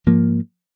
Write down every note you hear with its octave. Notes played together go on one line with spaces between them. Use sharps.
G#2 F3 A#3